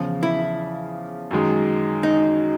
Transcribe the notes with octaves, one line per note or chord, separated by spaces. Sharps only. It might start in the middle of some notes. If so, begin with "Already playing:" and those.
Already playing: E2 C#3 F3
E4
F#2 D#3 G#3
D#4